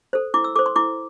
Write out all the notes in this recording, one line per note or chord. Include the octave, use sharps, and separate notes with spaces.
A4 C5
E4 D6
E6
A4 C5 D6
C6
E4 D6